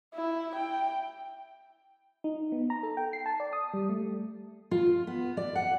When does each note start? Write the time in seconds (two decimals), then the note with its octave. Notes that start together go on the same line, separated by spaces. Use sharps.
0.15 E4
0.56 G5
2.24 D#4
2.52 B3
2.70 A#5
2.83 A4
2.97 G5
3.13 C7
3.26 A5
3.40 D5
3.53 D#6
3.74 G3
3.89 A3
4.71 F4
5.07 B3
5.37 D5
5.55 F#5